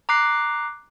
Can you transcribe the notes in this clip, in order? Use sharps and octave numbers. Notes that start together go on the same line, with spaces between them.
A#5 D6 F#6 C7